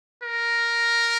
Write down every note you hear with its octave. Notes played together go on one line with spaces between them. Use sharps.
A#4